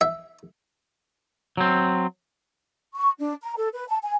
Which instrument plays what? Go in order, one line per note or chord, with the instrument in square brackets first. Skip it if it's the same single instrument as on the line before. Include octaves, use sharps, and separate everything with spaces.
[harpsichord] E5
[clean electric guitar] F#3 C4
[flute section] C#6
D4
A#5
A4
B4
A5
G#5